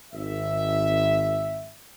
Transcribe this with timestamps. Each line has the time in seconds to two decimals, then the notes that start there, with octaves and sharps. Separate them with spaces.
0.13 G#1 E5